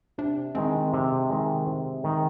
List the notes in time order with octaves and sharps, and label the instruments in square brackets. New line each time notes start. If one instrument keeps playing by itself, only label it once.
[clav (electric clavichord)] C3 [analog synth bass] D4
[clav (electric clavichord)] D#3 G#3 [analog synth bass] C4
[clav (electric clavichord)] C3
D#3 G#3
C3
D#3 G#3